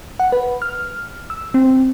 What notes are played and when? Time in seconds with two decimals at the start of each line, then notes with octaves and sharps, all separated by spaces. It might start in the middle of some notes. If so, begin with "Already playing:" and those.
0.20 F#5
0.32 B4
0.62 F6
1.30 E6
1.54 C4